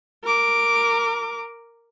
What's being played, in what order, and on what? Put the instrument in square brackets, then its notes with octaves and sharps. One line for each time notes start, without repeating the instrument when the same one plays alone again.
[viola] A#4 D6